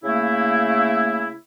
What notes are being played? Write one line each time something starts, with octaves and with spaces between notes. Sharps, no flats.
C#3 A3 A#3 E4